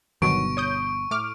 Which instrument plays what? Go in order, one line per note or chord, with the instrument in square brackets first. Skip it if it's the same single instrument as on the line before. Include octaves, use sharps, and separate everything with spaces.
[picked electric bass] G1 B2 [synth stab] D#3 F#3 [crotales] C#6 D7
[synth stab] C#5 D#6 G6
A2 D6 F6